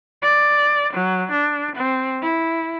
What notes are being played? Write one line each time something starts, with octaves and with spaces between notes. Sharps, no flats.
D5
F#3
D4
C4
E4